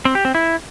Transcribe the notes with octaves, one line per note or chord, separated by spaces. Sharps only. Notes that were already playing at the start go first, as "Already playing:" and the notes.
C4
G4
C4
E4